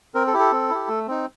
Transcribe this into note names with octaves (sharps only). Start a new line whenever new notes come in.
C4 A#4
A4
E4 G4
A4
C4
E4 G4
A3
C4 D#4